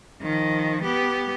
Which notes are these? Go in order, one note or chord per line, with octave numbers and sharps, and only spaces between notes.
D#3 F3
B3 G4